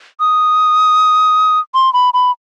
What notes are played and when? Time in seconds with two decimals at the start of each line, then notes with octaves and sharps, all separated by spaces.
0.20 D#6
1.74 C6
1.94 B5
2.14 B5